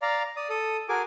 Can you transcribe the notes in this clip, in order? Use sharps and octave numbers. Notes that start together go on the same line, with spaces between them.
D5 F5 A#5
D5 D#6
A4 D#6
F#4 G#4 A#4 G#5 D6